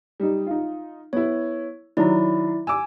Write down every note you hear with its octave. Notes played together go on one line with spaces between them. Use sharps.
G3 D#4
D#4 F4
B3 E4 C#5
D#3 F#3 E4 D5 A#5
G#5 D6 E6